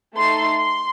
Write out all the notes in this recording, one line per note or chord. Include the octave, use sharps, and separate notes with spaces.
A3 D#4 A4 C6
C6